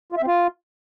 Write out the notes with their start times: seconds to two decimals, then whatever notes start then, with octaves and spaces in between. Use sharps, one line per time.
0.12 F4
0.17 E5
0.22 C4
0.27 F4